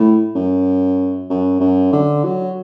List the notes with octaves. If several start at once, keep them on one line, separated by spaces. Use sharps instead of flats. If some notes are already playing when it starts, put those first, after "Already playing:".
Already playing: A2
F#2
F#2
F#2
D3
F#3